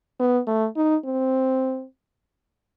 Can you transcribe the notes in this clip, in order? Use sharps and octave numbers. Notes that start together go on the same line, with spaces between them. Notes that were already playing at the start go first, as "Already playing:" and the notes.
B3
A3
D#4
C4